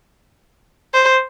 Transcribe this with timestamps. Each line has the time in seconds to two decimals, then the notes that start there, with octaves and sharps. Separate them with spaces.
0.94 C5